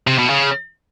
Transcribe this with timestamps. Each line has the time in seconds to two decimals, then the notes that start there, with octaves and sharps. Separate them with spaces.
0.07 C3
0.18 B2
0.30 C#3